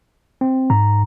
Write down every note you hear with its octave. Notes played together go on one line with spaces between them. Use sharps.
C4
G#2 A#5